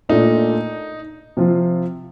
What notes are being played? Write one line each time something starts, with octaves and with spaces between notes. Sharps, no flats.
A#2 A3 D4 D#4 F4
C3 F3 C4 F4